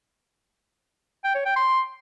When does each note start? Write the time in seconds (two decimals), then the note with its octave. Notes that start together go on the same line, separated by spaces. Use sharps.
1.24 G5
1.35 C#5
1.45 G5
1.56 C6